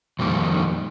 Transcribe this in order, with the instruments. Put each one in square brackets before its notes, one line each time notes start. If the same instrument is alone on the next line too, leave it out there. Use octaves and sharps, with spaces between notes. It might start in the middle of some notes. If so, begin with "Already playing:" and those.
[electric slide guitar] F2 A#2 D#3 G3